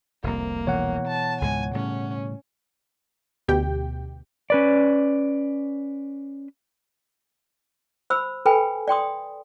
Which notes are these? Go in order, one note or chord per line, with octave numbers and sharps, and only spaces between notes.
F1 C2 A#3
B2 E3 B3 C#5 F#5
A5
C#2 G#2 G#3 G#5
A2 C#3 G3 C#4
D2 B2 G4 G5
C#4 B4 D5
C5 B5 E6
A4 B4 G5 G#5 B5
D5 G5 C6 D#6